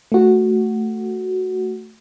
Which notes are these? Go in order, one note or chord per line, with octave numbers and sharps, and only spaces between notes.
A3 F#4